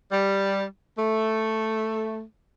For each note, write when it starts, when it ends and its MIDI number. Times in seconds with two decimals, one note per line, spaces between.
0.12 0.63 55
0.97 2.23 57